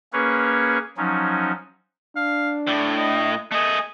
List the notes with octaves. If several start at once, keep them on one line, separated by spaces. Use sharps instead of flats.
A#3 C#4 G#4 B4 C#5
F3 F#3 C#4 D#4
D4 F5
A2 D5
D#5
A3 G#4 D#5